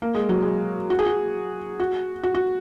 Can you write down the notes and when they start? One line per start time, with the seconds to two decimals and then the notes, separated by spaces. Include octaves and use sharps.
0.02 A#3
0.15 G#3
0.29 F#3
0.42 G#3
0.90 F#4
0.99 G#4
1.06 F#4
1.80 F#4
2.23 F#4
2.35 F#4